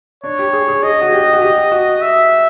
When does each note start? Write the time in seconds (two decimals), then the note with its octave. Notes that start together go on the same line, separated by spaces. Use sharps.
0.24 D4 C#5
0.39 G4
0.53 G#4
0.68 G#4
0.83 G#4 D#5
1.01 F#4
1.12 G4
1.33 F#4
1.42 G4
1.72 F#4
2.02 E5